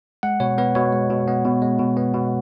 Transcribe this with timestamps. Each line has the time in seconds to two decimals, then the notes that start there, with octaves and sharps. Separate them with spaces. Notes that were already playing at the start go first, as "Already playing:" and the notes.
0.23 G#3 F#5
0.40 B2 C#5
0.58 B3 B4
0.75 B2 C#5
0.93 G#3
1.10 B2
1.28 B3
1.45 B2
1.62 G#3
1.79 B2
1.97 B3
2.14 B2